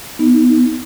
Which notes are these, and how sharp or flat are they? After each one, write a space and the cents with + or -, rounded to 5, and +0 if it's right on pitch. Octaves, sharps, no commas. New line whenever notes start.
B3 +0 D#4 +0